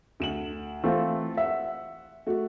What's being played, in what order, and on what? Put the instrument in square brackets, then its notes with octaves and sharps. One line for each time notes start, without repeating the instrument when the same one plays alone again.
[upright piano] D2 E7 F#7
[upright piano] E3 [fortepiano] A3 C4 F4
[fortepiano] E5 [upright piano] F#5
[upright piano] A3 F#4